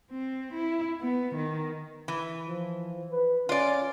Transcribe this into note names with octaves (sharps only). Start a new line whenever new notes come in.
C4
E4
B3
D#3
E3
F3
B4
C#4 F4 D5